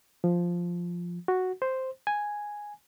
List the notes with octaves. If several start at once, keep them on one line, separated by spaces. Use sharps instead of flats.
F3
F#4
C5
G#5